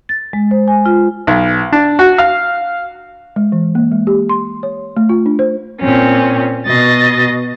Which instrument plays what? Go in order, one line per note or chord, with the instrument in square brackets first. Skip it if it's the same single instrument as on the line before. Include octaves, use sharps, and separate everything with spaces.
[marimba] A6
G#3
C5
G#5
F4
[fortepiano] B1
D4
F#4
F5
[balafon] G#3
E3
A#3
G#3
G4
C6
C#5
A3
F4
D4
C5
[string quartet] A#2 C4 C#4
B2 D#5 A6